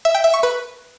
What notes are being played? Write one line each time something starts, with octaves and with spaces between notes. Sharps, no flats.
E5
G5
E5
C#6
B4